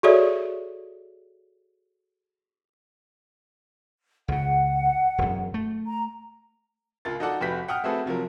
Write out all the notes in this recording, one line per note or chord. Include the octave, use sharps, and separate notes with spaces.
F#4 G#4 A4 C#5 D5 E5
C#2 C#3 F#5
E1 F#2
A3
A#5
C#2 F4 A#4 A6
D#4 F4 F#4 A4 D5 F#5
F1 F#4 G4 B4 B6
F#5 G5 D#6 F6
A3 C4 F#4 G#4 A4 B4
C3 F3 F#3 A#4